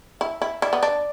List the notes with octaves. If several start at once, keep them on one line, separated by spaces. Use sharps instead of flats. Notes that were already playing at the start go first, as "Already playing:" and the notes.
E4 E5
E4
E4 D5
B3
D4